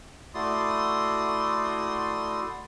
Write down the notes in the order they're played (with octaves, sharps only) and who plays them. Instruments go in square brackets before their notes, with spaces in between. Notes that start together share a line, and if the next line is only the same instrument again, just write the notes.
[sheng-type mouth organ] A3 E4 F#4 D5 C6 D#6